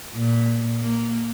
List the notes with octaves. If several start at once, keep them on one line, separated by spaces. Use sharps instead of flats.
A#2
A#3